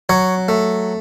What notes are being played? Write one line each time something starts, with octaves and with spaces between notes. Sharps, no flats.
F#3 C#5
A3